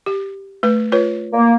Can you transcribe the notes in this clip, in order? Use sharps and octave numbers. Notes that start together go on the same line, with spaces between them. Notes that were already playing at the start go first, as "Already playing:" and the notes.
G4
A3 B4
F4 B4 C#5
A#3